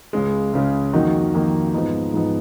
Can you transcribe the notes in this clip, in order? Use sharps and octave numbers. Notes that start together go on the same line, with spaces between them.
C#2 C#3 G#3
C#2 C#3 G#3
F2 D#3 A#3 D#4 F#4
F2 D#3 A#3 D#4 F#4
G#2 F3 B3 D#4
G#2 F3 B3 D#4